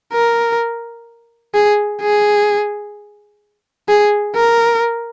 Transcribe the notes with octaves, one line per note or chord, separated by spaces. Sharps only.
A#4
G#4
G#4
G#4
A#4